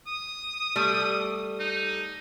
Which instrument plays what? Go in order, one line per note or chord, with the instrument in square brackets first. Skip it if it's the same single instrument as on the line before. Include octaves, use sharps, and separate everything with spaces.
[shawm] D#6
[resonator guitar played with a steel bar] G3 A3
[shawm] D#4